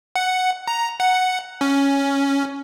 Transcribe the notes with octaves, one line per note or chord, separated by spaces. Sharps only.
F#5
A#5
F#5
C#4